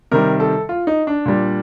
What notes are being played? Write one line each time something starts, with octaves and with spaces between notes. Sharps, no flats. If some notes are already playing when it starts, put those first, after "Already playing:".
C3 D#3 G3 A#4
A4
F4
D#4
D4
A#2 G3